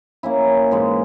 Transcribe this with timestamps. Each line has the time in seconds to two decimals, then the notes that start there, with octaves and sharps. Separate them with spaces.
0.23 A#3 C#4 E4
0.71 G#2 E3 G#3